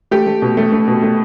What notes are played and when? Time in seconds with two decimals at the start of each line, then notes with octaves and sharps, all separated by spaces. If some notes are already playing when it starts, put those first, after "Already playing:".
0.11 A3 G4
0.27 A3
0.42 B2
0.57 A3
0.72 A3
0.88 B2
1.02 A3